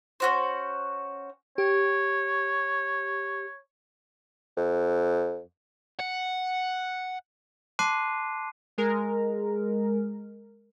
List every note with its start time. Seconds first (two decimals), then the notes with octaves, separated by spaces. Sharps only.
0.20 C#4 F#4 C5
1.58 G4 C#5
4.57 F2
5.99 F#5
7.79 A5 C6 D6 F#6 C7 D#7
8.78 G#3 A#4